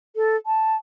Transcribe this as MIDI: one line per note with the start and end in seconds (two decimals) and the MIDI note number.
0.16 0.36 69
0.46 0.76 81